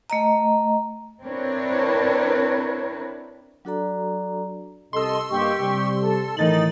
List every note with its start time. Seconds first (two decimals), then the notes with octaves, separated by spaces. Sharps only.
0.10 A3 D#5 A#5
1.22 C4 D4 E4 A#4 B4 C#5
3.65 F#3 D4 F#4 A4 D5 A#5
4.93 C2 A4 D#5 C6 E6
5.30 G2 A#3 G4 D#5 C#6
5.60 C3 G3
6.01 A4
6.37 A2 D#3 E3 D#4 A6 F#7